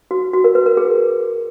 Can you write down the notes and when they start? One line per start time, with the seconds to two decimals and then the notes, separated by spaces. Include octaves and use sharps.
0.11 F#4
0.33 F#4
0.44 A#4
0.55 B4
0.66 A#4
0.77 G#4